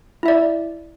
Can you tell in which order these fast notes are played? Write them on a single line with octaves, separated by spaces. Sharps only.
E4 E5 D5